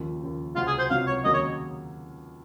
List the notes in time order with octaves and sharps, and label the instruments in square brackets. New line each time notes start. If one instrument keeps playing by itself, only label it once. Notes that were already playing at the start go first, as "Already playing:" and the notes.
Already playing: [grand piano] D#2 C#3 F3
D#2 C#3 F3
[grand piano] C#2 C3 F#3 C4 F#4 [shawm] F4
[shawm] G#4
C5
[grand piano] C#2 C3 F#3 C4 F#4 [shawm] F5
[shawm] C#5
[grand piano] D#2 C#3 F#3 A#3 [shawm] D#5
[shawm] C#5